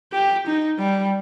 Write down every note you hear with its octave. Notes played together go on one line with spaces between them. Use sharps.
G4
D#4
G3